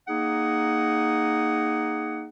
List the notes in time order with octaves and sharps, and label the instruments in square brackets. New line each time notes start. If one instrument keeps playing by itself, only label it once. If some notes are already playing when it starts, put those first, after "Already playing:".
[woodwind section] A#3 D#4 G#4 F#5